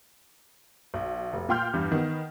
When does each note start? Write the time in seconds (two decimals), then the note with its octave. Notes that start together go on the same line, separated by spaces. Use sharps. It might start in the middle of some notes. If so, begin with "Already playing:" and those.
0.94 B1
1.33 F1
1.49 A#2 F5 G5 C6 F6 G6
1.73 E2 G2
1.92 D#3 B3